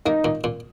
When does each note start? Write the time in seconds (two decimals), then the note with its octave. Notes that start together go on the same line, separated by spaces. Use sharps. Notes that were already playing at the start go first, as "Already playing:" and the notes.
0.05 A#3 D#4
0.24 A#2
0.44 A#2